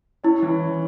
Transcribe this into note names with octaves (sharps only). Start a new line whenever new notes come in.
C#4 E4
E3
C#4